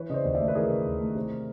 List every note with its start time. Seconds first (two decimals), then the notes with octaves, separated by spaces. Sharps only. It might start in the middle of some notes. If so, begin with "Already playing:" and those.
Already playing: E3 B4 C#5
0.09 C#3 D#5
0.14 C5 D5
0.24 D#2
0.35 D5 E5
0.40 A3
0.48 B4
0.55 E3 G#4 A#4
0.70 C#3
0.85 D#2
1.00 A3
1.15 C3